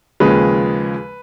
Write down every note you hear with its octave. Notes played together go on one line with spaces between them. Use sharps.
D#2 C#3 F3 G#3 B4